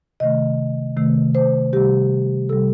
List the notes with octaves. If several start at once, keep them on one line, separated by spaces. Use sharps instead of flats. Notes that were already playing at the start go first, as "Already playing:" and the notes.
C3 D#3 A3 D#5
C3 D#3 A3
C5
C3 G3 G4
C3 G3 A4